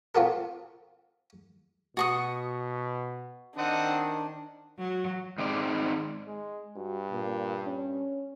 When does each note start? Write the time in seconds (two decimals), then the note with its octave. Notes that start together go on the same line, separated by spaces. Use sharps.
0.15 C4 F4 F#4 A4 A#4
1.97 B2 F#4 C#6 D#6
3.58 D#3 C4 D4 D#5 F#5
4.78 F#3
5.38 G#2 D#3 C4 D5
6.27 G#3
6.77 G2 F#4
7.11 A#2
7.64 C#4